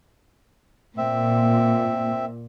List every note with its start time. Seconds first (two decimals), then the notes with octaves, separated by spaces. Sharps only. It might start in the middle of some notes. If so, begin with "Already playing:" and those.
0.98 A#2 C4 E5